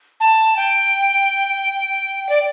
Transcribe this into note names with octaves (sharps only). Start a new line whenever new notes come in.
A5
G5
D5